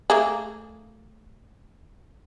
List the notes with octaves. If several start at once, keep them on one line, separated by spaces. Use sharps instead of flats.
A3 A#3 G#4